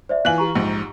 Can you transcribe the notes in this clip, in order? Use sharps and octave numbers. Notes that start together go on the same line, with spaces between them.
C5 D5 E5
E3 F4 G#5 F#6 F#7
G4 A#5 C#6
A#1 G#2